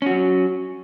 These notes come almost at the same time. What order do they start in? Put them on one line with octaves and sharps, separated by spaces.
C#4 F#4 F#3